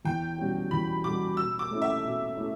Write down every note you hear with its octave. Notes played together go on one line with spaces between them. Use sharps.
E2 G5
B2 G3 C#4 F#4
E2 B5
B2 G3 C#4 F#4 D6
B2 E6
D6
A3 C#4 E4
E5
B2
A3 C#4 E4